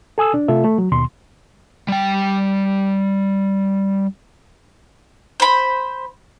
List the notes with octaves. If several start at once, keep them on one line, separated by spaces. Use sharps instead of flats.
A4 G#5 D#6 E6
D4
C3 A3 F4 A4 E5
A3
F#3
D#2 B2 C6
G3 G5
C5 B5